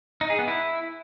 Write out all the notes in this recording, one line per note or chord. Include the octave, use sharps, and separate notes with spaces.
D#4
G#4
B3
E4